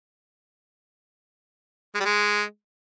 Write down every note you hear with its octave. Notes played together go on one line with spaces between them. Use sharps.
G#3
G3
G#3